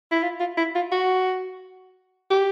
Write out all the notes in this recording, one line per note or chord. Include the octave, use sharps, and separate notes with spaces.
E4
F4
F4
E4
F4
F#4
G4